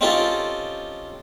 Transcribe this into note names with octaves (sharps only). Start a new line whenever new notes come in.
C4 C#4 D#4 F4 G4 A4